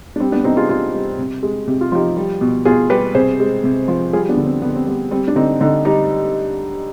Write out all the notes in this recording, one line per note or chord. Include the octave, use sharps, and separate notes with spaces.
D4
G3 C4
B3 D4
C3 C4 D#4
F4 G#4
C3 F4 G#4
G3
C3
G#3
C3 G4
F4
F3 D#4 G4
G3
B2
B2 F4 G#4
G3 G4 B4
C3 G#4 C5
G#3
C3
F3
G3 F4 G#4
B3 D4
D3
C4
D3 B3
C4
G3 B3
G3 C4
D4
D3 C4 D#4
D3 C4 D#4
G3 D#4 G4